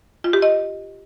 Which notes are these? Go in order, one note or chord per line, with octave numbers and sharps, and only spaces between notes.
F4
G4
D#5